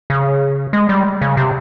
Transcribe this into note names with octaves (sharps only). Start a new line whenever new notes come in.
C#3
G#3
G3
C#3
C3